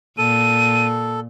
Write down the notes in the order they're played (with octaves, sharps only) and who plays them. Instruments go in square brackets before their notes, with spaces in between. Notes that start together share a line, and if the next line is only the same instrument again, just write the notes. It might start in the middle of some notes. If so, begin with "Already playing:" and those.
[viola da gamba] A#2 [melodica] A4 [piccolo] D#7